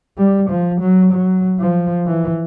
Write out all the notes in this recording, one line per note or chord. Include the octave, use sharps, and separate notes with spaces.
G3
F3
F#3
F#3
F3
E3